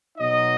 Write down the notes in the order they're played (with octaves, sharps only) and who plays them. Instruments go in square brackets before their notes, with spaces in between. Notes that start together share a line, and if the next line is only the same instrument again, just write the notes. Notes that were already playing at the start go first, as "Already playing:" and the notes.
[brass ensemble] B2 F#3 D#4 D#5